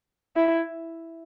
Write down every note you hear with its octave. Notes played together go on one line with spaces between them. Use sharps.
E4